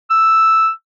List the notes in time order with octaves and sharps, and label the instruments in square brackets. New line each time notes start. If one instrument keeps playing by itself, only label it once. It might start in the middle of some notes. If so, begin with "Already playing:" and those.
[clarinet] E6